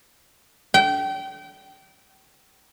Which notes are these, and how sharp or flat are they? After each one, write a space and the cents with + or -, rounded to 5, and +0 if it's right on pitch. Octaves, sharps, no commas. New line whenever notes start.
G5 -25